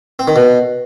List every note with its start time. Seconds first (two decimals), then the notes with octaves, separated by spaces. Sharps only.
0.19 C4
0.28 D#3
0.36 B2